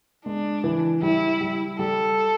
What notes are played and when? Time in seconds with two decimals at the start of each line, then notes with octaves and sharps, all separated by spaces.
0.26 G#3 D4
0.64 E3
1.02 G3 E4
1.41 G3
1.79 G3 A4